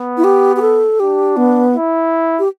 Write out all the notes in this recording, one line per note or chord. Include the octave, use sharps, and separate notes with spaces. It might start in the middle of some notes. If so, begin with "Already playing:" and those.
Already playing: B3
E4
G4
G4
A4
D4 G4
B3
E4
G4